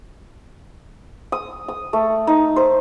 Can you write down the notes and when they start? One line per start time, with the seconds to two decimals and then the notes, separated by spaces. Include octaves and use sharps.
1.32 D#6
1.68 D#6
1.93 A3
2.27 D#4
2.56 C5